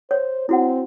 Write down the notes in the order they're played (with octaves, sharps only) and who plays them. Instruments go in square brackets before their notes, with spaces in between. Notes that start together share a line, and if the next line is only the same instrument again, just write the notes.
[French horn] C5 [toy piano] C#5
[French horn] C4 [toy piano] E4 F#4 F#5